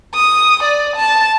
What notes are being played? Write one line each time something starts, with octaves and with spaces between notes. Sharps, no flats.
D#6
D5
A5